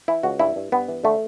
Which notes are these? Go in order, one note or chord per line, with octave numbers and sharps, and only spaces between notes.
E3 E4
C#2 F#4
G2 E4
G2
G2 B3
E3
D3 A3